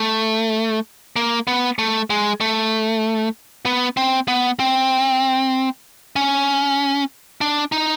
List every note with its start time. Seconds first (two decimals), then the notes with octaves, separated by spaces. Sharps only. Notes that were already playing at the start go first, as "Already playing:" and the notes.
Already playing: A3
1.16 A#3
1.47 B3
1.79 A3
2.10 G#3
2.41 A3
3.66 B3
3.97 C4
4.28 B3
4.59 C4
6.16 C#4
7.41 D4
7.72 D#4